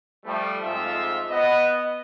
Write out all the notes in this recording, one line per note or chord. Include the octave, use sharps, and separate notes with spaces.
F3 G3 A3
F2 G#2 F4 E5
B3 D#5